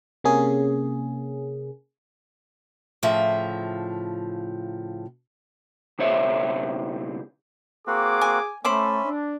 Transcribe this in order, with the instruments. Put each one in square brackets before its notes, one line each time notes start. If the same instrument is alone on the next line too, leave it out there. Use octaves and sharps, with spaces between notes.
[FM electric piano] C3 A#3 C#4 G#4
[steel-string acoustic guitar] A2 C#3 F3 E5
[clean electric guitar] C#2 B2 C5 C#5 E5
[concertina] A#3 C4 F#4 [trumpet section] G#4 D6
[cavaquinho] G#5
[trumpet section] A3 [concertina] C#4 E5 [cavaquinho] C5 B5 D6
[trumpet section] D4